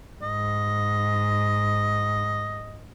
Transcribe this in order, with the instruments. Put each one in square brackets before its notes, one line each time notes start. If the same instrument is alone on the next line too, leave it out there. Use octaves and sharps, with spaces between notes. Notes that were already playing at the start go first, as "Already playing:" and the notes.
[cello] G#2 [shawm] D#5